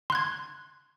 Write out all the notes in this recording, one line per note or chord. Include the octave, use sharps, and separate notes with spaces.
C6 F#6 G#6